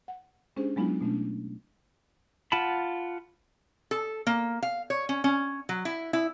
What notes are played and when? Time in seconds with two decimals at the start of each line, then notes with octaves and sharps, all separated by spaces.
0.08 F#5
0.56 G#3 C#4 D4 G4 G#4 C5
0.76 F#3 G#3 B3 D4 E4 F4
1.01 B2 A3 C#4 D4
2.52 F4 F#5 A5 B5
3.91 A4
4.27 A#3
4.62 F5
4.90 C#5
5.09 C#4
5.24 C#4
5.69 F#3
5.85 E4
6.13 E4